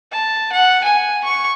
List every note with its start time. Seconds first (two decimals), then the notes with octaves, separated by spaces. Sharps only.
0.12 A5
0.53 F#5
0.84 G#5
1.24 C#6